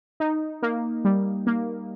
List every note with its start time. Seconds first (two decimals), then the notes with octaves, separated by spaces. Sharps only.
0.20 D#4
0.63 A#3
1.05 G3
1.47 A#3